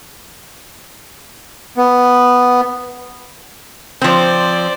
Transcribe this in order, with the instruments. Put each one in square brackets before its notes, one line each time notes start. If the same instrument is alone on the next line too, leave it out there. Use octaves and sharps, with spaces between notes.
[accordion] B3
[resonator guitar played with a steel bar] F3 C4 [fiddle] C5 D5